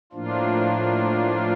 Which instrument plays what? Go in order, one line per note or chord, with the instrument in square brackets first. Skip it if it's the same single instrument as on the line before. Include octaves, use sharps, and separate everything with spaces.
[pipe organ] A2 F3 A#3 D4 F4